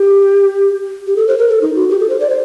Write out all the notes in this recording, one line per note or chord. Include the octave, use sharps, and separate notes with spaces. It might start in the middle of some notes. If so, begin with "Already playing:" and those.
Already playing: G4
G4
A4
C5
A#4
A4
D#4
F#4
G4
A4
C5
D5
C5